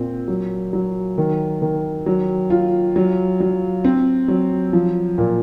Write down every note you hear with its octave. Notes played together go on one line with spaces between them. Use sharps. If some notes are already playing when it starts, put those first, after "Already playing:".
Already playing: A#2 C4
F#3
F#3
D#3
D#3
F#3
F4
F#3
F#3
C4
F#3
F3
A#2